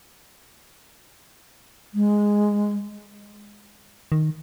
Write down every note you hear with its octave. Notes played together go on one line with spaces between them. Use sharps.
G#3
D#3